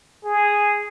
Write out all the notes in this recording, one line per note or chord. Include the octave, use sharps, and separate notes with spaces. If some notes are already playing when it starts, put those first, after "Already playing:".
G#4